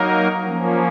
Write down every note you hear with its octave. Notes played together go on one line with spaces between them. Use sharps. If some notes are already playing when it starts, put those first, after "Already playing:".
Already playing: F#3 A#3 D#4 A#4
F3 A#3 C#4